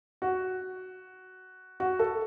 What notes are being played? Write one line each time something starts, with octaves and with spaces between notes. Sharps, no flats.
F#4
F#4
A4